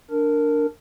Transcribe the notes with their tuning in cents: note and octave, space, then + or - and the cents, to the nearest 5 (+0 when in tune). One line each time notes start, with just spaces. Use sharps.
D4 +0 A#4 -10